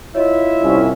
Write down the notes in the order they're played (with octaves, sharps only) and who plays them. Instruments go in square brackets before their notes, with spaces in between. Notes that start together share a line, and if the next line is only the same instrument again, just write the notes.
[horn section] E4 F4 E5 [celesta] C#5 D#5
[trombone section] C2 C#4